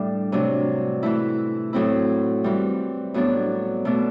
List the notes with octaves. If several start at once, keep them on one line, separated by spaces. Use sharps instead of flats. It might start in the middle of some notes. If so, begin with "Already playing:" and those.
Already playing: A2 G3 D4
C3 F#3 A3 D4
E3 A3 E4
A2 F#3 C4 E4
E3 G3 C4
A2 F#3 B3 D4
B2 A3 D4